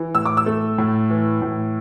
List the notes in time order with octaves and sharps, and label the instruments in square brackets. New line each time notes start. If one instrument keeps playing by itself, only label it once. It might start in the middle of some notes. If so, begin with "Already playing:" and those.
Already playing: [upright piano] E3
A2 E6
D6
E6
A3
A2
E3
A2